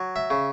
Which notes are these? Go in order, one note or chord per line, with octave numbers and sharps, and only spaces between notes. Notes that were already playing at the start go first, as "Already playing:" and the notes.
Already playing: F#3
E5
C#3